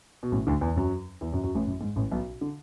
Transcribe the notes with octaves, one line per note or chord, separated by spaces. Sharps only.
B2
A1 A2
D2 D3
E2 E3
F#2 F#3
E2 E3
F#2 F#3
F#2 F#3
A1 A2
F#2
G#2
A1 A2
B1 B2
D3